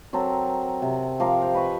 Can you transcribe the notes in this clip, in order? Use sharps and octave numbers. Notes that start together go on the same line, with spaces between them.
F#3 C4 A4 A#4
C3
F3 A#4 F5 D6
G5
B4 D#5 C#6